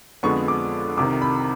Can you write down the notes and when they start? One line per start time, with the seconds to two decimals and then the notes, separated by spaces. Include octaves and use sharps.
0.23 F2 D3 F3 G#3 B3 C#6
0.48 D6
0.97 C2 C3 D#3 D6
1.22 B5